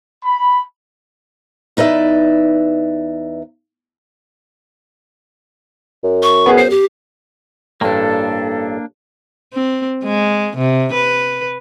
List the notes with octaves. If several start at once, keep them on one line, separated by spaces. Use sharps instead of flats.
B5
E2 D#4 B4 D5 E5
F#2
C#6
B3 G#4
C5 C7
G4
A1 G2 A#3 D4 A4
C4
G#3
C3
B4